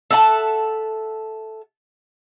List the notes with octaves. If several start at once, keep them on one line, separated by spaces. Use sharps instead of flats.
A4 E5 F#5 A5